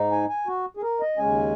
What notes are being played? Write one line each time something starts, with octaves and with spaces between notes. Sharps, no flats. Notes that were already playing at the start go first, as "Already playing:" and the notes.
Already playing: G#2 D#4
G#5
G#5
F#4
G#4
A#4
D#5
D#2 C#3 G#3 C#4 G#5